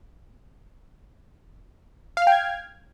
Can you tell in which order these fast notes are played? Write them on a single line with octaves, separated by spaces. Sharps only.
F5 F6 G5 G#6